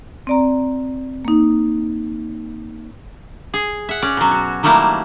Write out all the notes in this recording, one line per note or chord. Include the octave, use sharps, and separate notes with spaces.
C4 D5 A#5
A#3 D#4
G#4
E5 F#5
C#4 D5
B2 F#3
F#4
D#3 F#3 G3 A3 A#3 E4